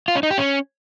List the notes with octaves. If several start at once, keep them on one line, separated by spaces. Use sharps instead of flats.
F4
C#4
D#4
G4
C#4